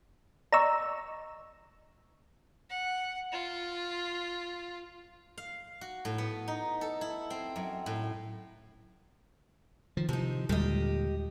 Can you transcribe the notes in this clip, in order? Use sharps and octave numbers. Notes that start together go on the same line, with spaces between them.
D5 D#5 A#5 C#6 E6
F#5
F4
F5
F#4
A2
B3
D#4
A4
E4
C4
F#2
A2
D#3 F3
C3 F3 D#4
D#2 A#2 D3 G3 G#3 G4 D#5